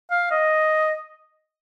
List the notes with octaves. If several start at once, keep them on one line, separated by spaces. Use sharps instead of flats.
F5
D#5